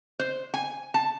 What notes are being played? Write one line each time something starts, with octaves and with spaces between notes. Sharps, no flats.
C5
G#5
A5